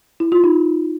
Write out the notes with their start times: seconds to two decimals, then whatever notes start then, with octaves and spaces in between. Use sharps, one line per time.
0.20 E4
0.32 F4
0.44 D#4